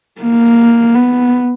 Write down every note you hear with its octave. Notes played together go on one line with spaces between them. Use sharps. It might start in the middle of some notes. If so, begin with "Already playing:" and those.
A#3
B3